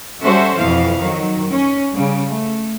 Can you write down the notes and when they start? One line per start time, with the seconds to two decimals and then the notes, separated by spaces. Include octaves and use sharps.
0.22 G3 C#4 F#4 A4 C5 E5
0.56 F2 B2 E3 F5
1.01 D#3 F#3
1.51 C#4
1.92 C#3 G3
2.29 A3